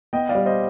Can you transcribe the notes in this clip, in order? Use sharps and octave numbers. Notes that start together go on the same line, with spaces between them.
B3 D#5 G5
D5 F5
G3
C5 D#5